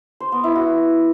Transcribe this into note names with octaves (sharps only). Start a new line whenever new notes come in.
C5
B3
E4
F#4